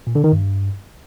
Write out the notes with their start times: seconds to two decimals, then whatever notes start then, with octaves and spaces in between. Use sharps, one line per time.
0.07 A#2
0.15 D3
0.24 D#3
0.32 G2